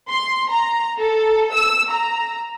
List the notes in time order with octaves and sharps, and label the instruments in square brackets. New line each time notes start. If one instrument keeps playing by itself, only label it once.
[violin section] C6
A#5
A4
E6
A#5